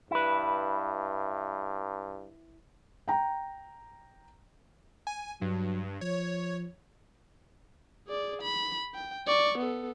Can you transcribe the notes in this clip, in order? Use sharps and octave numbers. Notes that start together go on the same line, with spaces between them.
G2 E4 B4
G5 A#5
G#5
G2 F#3
F3 C#5
G#4 D5
B5
G5
D5 C#6
B3 A4